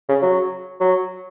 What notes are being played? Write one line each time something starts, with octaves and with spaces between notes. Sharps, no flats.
C#3
F#3
F#3